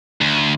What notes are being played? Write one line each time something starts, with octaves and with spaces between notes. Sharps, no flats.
D2